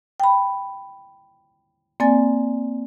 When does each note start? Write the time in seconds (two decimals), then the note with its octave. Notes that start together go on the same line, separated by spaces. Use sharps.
0.20 G5 B5
2.00 A#3 C4 D5 G#5 A6